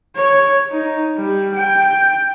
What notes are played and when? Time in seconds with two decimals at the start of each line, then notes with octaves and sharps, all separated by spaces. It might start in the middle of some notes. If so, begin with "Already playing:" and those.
0.16 C#5
0.71 D#4
1.16 G3
1.54 G5